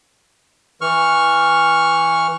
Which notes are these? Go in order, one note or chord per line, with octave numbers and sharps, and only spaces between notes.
E3 C#6 F6